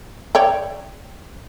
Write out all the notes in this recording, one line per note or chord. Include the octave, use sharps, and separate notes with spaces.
C#5 D5 G5